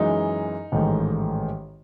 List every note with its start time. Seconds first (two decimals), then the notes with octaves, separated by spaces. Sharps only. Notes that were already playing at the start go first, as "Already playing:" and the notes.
Already playing: F#2 E3 G#3 D#4
0.72 A1 G#2 D#3 A3